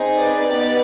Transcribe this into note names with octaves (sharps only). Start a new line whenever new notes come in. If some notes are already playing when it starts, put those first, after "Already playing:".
Already playing: C4 D#4 G#4
B4 D5
B3 D#4 G4